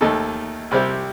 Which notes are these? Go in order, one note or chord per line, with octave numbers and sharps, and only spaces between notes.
D#2 D#3 A3 D#4 A4
C2 C3 G3 C4 G4